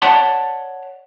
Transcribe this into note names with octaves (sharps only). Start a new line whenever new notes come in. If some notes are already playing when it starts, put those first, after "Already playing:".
C#5 D5 E5 F#5 A5 C6